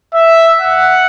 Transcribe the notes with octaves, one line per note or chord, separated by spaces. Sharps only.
E5
F#5